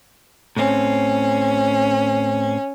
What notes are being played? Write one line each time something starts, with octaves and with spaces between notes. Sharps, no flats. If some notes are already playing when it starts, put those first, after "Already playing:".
A2 C4 C#4